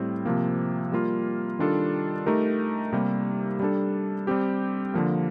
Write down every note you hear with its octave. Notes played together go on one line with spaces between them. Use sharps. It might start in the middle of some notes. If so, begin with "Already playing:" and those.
Already playing: A2 G3 C4
C3 F3 A#3
G3 A#3 F4
D#3 G3 D4 F4 A4
A3 D#4 G4 A#4
C3 G3 A#3
G3 D4 A4
G3 C4 G4
D3 F3 A#3